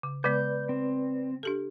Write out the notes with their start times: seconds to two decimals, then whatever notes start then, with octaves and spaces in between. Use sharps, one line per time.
0.03 C#3
0.24 C#3 G#3 B3 B4 D5 G6
0.69 C4
1.43 D4 G4 A4